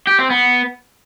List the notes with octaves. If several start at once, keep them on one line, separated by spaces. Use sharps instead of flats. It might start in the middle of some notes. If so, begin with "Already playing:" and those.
G4
C4
B3